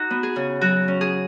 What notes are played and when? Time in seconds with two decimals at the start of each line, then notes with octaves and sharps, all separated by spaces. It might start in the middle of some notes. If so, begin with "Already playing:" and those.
Already playing: D#4 F#4
0.10 B3
0.23 G#4
0.36 C#3
0.61 F#3 F#4
0.88 C#4
1.01 G#4